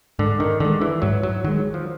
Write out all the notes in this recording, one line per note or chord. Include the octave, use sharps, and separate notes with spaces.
G#2 D3
D#3
D3 D#3 G#3
E3
G#2 F#3
F#3
D#3 F#3 G#3
F3